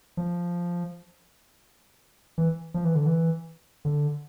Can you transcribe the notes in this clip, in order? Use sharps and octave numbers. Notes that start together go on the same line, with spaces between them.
F3
E3
F3
E3
D3
E3
D3